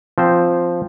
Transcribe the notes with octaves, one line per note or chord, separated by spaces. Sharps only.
F3 C4 C5